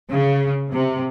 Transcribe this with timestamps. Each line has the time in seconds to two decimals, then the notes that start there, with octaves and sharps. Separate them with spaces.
0.11 C#3
0.73 C3